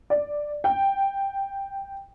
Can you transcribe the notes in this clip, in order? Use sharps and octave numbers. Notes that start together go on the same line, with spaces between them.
D5
G5